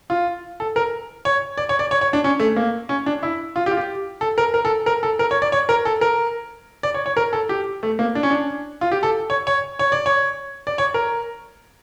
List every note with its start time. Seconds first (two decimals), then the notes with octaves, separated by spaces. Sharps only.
0.10 F4
0.60 A4
0.76 A#4
1.25 C#5
1.58 D5
1.69 C#5
1.79 D5
1.91 C#5
2.01 C#5
2.13 D4
2.24 C#4
2.40 A3
2.56 A#3
2.89 C#4
3.06 D4
3.23 E4
3.56 F4
3.66 G4
3.71 F4
3.77 G4
4.21 A4
4.38 A#4
4.54 A#4
4.65 A4
4.86 A#4
5.03 A4
5.19 A#4
5.31 C#5
5.42 D5
5.52 C#5
5.69 A#4
5.85 A4
6.01 A#4
6.83 D5
6.94 C#5
7.06 C#5
7.17 A#4
7.33 A4
7.49 G4
7.83 A3
7.99 A#3
8.15 D4
8.23 C#4
8.30 D4
8.81 F4
8.92 G4
9.03 A4
9.30 C#5
9.47 C#5
9.79 C#5
9.92 D5
10.06 C#5
10.67 D5
10.78 C#5
10.94 A#4